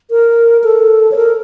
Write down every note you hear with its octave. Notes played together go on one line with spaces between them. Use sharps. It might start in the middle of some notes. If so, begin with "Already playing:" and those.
A#4
A4
C#5
A#4